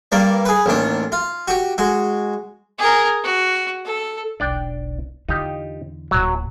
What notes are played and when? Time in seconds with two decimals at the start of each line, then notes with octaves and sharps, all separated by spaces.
0.12 G2 A#3 D5
0.45 G#4 B4
0.66 A1 D#2 D4
1.12 F4
1.48 F#4 G4
1.78 G#3 F#4
2.79 G#4 A#4
3.24 F#4
3.85 A4
4.40 E1 B1 D4 D5 G5
5.29 E2 D3 D#4 F4 G4
6.11 D1 A#2 F#3